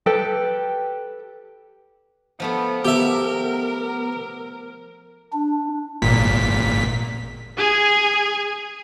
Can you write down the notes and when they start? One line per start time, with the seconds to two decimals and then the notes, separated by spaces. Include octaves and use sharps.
0.06 G4 A4 B4 G5
2.40 F3 A3 B3 A4
2.85 B3 G4 A#4 E5
5.33 D4
6.02 G#1 A#2 B6
7.58 G#4 G#5